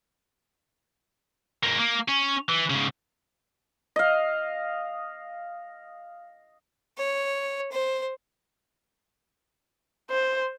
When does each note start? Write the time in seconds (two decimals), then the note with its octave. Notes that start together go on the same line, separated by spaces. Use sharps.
1.63 G#2 A#3
1.79 A#3
2.08 C#4
2.49 E3
2.70 G#2 C#3
3.96 D#5 F5
6.98 C#5
7.72 C5
10.10 C5